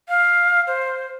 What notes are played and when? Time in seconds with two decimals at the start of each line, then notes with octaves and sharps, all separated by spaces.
0.09 F5
0.67 C5